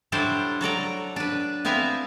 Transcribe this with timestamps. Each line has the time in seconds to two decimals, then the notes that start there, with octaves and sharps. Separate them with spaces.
0.12 F#3 G3 D4 E4 A4 C5
0.61 F#3 A4 D5 A#5
1.16 D4 B4
1.65 B3 C4 E4 E5 F5 G#5